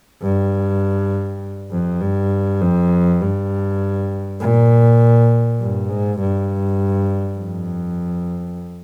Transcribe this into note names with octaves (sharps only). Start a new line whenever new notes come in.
G2
F2
G2
F2
G2
A#2
G2
G#2
G2
F2